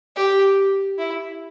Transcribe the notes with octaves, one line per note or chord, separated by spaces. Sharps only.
G4
E4